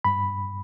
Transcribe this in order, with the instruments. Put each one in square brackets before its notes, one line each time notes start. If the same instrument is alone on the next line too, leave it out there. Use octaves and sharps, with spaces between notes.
[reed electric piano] G2 B5